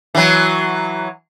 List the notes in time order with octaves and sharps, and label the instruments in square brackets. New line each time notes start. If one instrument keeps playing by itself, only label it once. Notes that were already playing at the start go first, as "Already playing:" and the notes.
[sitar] E3 F#3